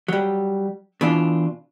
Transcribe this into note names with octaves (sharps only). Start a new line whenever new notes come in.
F#3 G3
B2 E3 D4 F4